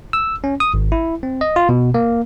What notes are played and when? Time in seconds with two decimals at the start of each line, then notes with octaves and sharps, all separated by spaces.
0.13 E6
0.44 C#4
0.60 D#6
0.74 G#1
0.92 E4
1.23 C4
1.41 D#5
1.56 F4
1.69 B2
1.94 A#3